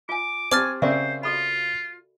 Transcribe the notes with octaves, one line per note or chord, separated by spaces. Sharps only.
F4 G#5 D6
C4 G4 G#5 A5 D6 F6 A6
C#3 C4 A#4 C5 D5 E5 C#6
F4 F#4 A4 B5